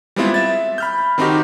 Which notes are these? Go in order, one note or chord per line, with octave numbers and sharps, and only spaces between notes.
G3 G#3 B3 C4 E4 F4
E5 A6
B5 F6 G6
D#3 C4 D#4 F#4 G4